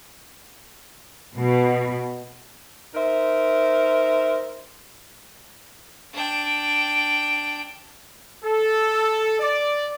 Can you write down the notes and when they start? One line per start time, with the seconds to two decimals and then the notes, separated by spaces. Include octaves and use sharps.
1.37 B2
2.94 D#4 A#4 C5 E5
6.13 D4 G5
8.45 A4
9.40 D5